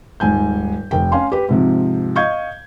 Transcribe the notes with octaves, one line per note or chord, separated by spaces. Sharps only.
D#1 G#2 G#5 G6
F1 G5
C#4 F5 G#5 C6
G4 B4
G#2 C3 F3
D#5 F5 C#6 G6 G#6